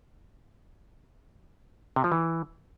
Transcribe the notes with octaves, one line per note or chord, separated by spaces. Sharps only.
C3
F3
E3